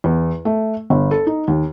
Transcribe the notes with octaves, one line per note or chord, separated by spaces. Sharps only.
E2
A3
G1
A4
D#4
D#2